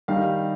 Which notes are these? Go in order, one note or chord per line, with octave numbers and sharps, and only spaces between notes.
D#3 G3 D#4 F5